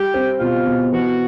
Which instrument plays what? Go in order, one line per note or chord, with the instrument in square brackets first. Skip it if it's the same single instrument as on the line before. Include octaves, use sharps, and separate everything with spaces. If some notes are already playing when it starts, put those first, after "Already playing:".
Already playing: [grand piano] G3 [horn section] G4
[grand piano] C4
[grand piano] B2 [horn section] F4
[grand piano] B2
[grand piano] E3 [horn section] F#4